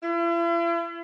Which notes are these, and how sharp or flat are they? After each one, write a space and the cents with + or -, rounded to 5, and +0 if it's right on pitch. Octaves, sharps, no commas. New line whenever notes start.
E4 +45